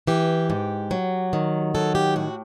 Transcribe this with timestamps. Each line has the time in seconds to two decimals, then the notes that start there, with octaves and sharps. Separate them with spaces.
0.07 E3 G4
0.50 G#2
0.91 F#3
1.33 D#3
1.75 F#3 A4
1.95 G4
2.16 A2 F#4